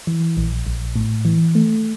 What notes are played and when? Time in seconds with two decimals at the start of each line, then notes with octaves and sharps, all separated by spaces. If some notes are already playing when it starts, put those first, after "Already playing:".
0.07 E3
0.37 A#1
0.66 A#1
0.96 A2
1.25 E3
1.55 A3